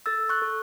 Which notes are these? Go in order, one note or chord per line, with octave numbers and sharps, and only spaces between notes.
A4 E6 A6
C#6 F#6
A4